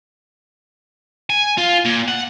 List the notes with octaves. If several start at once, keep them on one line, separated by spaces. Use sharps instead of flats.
G#5
F4
A#2
F#5